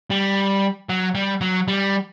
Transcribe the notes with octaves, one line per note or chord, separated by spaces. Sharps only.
G3
F#3
G3
F#3
G3